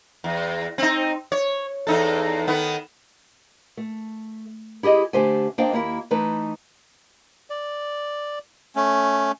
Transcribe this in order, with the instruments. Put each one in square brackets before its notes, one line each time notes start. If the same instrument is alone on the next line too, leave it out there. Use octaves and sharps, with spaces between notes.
[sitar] E2
C4 D#4
C#5
E2 D#4 A4
D#3 B3
[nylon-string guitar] A3
E4 G4 G#4 D#5
D3 A3 G4 C5 E5 G#5
A#3 D4 C5 D#5 F5 G5
D#2 A#3 E4 E5
E3 A3 D#4 B4
[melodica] D5
A3 C#4